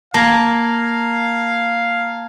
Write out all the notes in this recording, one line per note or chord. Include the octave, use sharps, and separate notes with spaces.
A#3 F5 A5 A#5 G#6